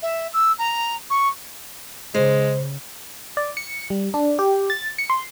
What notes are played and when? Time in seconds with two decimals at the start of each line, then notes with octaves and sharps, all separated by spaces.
0.02 E5
0.33 E6
0.58 A#5
1.10 C#6
2.15 C#3 G#3 C5
3.37 D5
3.57 C#7
3.90 G3
4.14 D4
4.39 G4
4.70 A6
4.98 C#7
5.10 C6